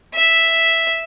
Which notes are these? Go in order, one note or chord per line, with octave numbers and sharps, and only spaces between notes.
E5